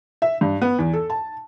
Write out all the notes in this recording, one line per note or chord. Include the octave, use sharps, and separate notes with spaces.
E5
G2
B3
E2
A4
A5